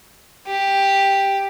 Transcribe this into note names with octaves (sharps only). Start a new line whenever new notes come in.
G4